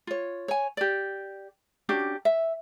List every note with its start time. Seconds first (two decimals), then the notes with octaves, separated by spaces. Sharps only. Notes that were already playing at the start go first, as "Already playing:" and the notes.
0.07 F4 C#5
0.48 C#5 G#5
0.77 G4 D5
1.89 C#4 D4 F#4 G4
2.25 E5